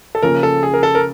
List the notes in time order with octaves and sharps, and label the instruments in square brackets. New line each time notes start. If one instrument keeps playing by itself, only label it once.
[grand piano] A4
[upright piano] C#3 F3 A#3 C#4 [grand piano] A#4
[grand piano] A4
G#4
A#4
A4
A#4